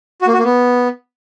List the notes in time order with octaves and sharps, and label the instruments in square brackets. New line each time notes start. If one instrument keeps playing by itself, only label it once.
[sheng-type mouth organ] F#4
A#3
F#4
A#3
B3